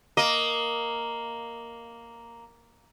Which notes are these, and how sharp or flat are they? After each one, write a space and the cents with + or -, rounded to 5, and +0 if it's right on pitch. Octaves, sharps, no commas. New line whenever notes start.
A#3 +0 D#5 +0